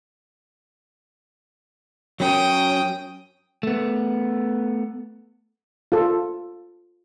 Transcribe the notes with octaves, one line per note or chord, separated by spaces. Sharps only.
F#3 C#4 G5 D#6
A3 B3
F4 A4